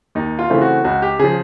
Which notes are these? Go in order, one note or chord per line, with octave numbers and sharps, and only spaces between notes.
D#2 D#4
F4
C#3 E3 A3 C4
F#4
C#2 F#4
G4
C#3 F3 G#4